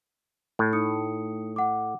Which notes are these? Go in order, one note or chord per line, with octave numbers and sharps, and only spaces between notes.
A2
D#4 D#6 C#7
F#5 D6